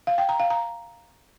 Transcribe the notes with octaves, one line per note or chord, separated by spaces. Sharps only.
F5
G5
A#5
F5
A#5